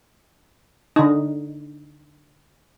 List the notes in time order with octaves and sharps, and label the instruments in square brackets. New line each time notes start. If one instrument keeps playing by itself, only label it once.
[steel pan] D3 D#4